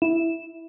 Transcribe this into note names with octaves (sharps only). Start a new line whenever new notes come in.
E4